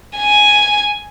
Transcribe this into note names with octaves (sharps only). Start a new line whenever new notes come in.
G#5